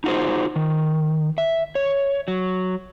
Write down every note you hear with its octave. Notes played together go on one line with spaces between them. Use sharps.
D#4 F4 F#4 G#4 C5
D#3
E5
C#5
F#3